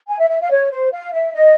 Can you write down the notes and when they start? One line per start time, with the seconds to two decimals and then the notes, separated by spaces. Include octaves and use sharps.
0.08 G#5
0.19 E5
0.30 E5
0.41 F5
0.51 C#5
0.72 C5
0.92 F5
1.14 E5
1.34 D#5